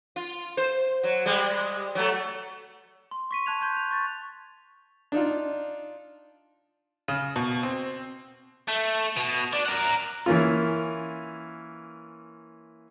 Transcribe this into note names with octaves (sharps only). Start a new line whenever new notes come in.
F4
C5
F#3
G3 G#3
F#3 A3
C6
C#6 B6 D#7
A5 F#6 G#6 F7
C6 G6 G#6
F7
C#6 A6
D4 D#4 F4
C#3
B2
C4
A3
B2
D4
A#4 F#5
E3 A#3 C#4 F4